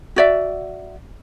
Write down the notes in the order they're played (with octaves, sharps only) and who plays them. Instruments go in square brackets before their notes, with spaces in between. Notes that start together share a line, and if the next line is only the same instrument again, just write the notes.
[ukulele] F#4 D5 E5